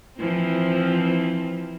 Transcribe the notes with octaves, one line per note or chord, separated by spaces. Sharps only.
E3 F3 C4